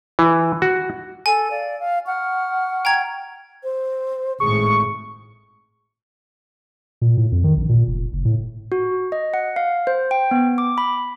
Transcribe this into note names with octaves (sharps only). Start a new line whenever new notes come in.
E3
F#4
A4 G#5
D5 F5
F5
F#5 C#6 F6
G5 A#5 G#6
C5
G#1 A2 G#4 C#6
A#2
A2
F2
D#3
A#1
A#2
F1
F#1
A2
F#4
D#5
F#5
F5
C5
G5
B3
D6
B5